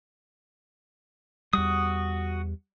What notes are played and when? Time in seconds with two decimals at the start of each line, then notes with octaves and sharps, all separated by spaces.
1.53 E2 G3 F#4 D#6